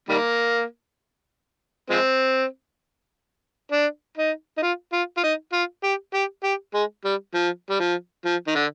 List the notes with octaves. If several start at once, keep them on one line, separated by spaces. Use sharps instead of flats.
D#3 G3 A#3
F3 G#3 C4
D4
D#4
D#4
F4
F4
F4
D#4
F4
G4
G4
G4
G#3
G3
F3
G3
F3
F3
D#3
D3